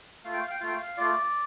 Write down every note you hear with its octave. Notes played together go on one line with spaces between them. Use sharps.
A3 F4 F5
G5
F5
G5
A3 F4 F5
G5
F5
A3 F4 D5